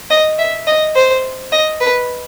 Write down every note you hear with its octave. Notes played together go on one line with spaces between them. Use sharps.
D#5
E5
D#5
C5
D#5
B4